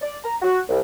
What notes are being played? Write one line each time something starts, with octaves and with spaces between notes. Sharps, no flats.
D5
A#5
F#4
C2